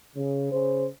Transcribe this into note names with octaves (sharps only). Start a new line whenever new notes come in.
C#3
C#3 C5